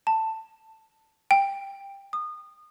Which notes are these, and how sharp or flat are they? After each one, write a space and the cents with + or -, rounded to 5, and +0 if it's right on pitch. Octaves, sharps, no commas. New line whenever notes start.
A5 +10
G5 +15
D#6 -25